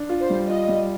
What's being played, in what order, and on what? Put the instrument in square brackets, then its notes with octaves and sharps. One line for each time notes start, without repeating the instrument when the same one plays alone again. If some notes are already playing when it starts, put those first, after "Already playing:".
Already playing: [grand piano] D4
F4
[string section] C5
[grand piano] G3
[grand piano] F4 [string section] D#5
[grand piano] G3